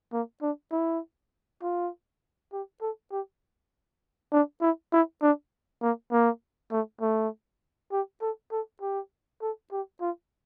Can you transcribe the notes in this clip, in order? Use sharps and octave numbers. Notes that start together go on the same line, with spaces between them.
A#3
D4
E4
F4
G4
A4
G4
D4
E4
E4
D4
A#3
A#3
A3
A3
G4
A4
A4
G4
A4
G4
F4